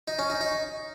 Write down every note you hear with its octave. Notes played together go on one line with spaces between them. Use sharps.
D#4
C#4
D#4
D#4